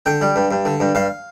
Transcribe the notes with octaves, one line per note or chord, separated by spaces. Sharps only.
D3 G5
G3
G2
G2
D3
G2
G2 F5